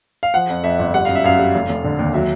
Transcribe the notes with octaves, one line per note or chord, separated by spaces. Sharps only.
F5
F3 F#5
F2
F2 E5
G1
G3 F#5
F#2 F5
E5
F#2 F5
G3
F1
F1
D3
D#2
F#3 E5